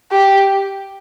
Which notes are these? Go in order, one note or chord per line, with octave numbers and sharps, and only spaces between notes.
G4